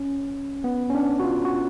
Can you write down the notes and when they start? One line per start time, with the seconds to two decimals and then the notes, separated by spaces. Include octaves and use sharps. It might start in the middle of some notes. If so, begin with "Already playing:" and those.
Already playing: C#4
0.64 B3
0.90 C#4
0.95 D4
1.19 F#4
1.24 F4
1.45 F#4